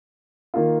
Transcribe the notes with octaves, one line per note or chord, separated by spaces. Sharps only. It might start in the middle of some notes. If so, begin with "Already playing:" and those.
D#3 A#3 F4